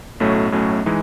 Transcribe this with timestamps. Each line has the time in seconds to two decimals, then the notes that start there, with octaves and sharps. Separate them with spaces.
0.20 B1 A2 F#3 A3 C#4
0.52 B1 A2 F#3 A3 C#4
0.86 E3 G#3 D#4